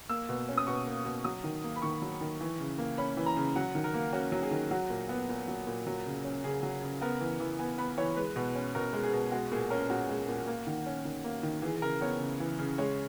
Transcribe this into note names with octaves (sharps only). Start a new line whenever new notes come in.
A#3 E6
B2
C#4
D#6
B2 C#6
A#3
B2
F#3 D#6
D#3
A#3
B5
D#3 C#6
F#3
D#3
E3
C#3
A#3
C#4 B5
E3
A#5
C#3
F#3 F#5
D#3
A#4
A#3
C#4 F#4
F#3
G#4
D#3
F#3 F#4
A#2
B3
A#2
F#3
A#2
F#3
C#3
C#4
C#3 G#4
F#3
C#3
B3 A#4
E3
E3
B3 G#5
B3 B5
E3 C#5
G#3 B4
B2
C#4
B2 A#4
G#3
G#4
B2
G#3 F#4
A#2 G#4
C#4 A#4
A#2 F#4
G#3
A#2
A#3
D#3
C#4
D#3
A#3
D#3
E3 G#4
C#3 A#4
B3 C#5
C#3
E3
C#3
G#3 C#5